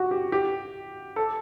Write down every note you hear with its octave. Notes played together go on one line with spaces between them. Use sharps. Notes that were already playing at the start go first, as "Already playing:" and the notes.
Already playing: F#4 G4
G4
G4
A4